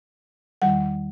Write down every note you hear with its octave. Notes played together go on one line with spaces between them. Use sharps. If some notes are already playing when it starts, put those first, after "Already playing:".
E2 D#3 G3 F#5